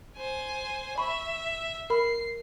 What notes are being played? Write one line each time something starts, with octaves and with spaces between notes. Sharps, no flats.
C5 G#5
E5 B5 C#6
A#4 B5 C7